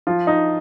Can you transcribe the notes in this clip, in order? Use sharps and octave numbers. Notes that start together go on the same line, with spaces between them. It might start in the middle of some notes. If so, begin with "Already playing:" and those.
F3 F4
D#4